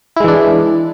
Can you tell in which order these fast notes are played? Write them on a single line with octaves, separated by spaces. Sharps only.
E4 G#3 E3 D4